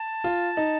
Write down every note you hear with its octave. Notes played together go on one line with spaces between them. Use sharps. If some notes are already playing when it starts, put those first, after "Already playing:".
Already playing: A5
F4
D#4